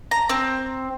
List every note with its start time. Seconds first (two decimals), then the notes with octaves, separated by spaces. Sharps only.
0.11 A#5
0.29 C4